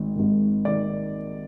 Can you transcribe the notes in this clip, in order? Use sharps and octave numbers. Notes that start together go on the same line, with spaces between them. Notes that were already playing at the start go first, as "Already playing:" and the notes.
Already playing: G#1 G#2 D#3
G#1 G#2 D#3
D#3 D5